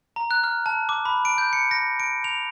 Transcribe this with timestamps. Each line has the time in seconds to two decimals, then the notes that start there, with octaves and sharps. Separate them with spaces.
0.16 A#5
0.31 F#6
0.44 F6
0.66 A5
0.89 D6
1.05 B5
1.25 D7
1.38 G6
1.53 C#7
1.71 A#6
2.00 D7
2.24 F7